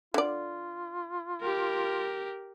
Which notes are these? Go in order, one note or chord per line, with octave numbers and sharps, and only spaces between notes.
D3 F4 D5
G4 A#4